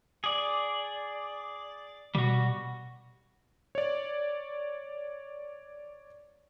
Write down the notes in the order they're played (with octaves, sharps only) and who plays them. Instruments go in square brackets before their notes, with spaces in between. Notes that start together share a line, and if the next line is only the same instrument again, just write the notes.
[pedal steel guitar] G#4 D5
[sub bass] B2 [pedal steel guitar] G3 F#4
[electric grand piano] C#5 D5